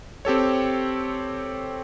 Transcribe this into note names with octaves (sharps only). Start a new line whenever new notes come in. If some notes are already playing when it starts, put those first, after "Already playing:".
C4 G4 A4 C#5